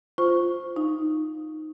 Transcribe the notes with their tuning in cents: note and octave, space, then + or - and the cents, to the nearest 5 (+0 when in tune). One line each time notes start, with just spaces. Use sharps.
F4 +0 C5 -5 C#6 +0
D#4 +0 F5 +5